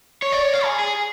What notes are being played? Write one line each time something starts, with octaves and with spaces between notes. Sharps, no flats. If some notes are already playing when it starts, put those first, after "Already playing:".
C#5
D5
C#5
F5
G#4
G#4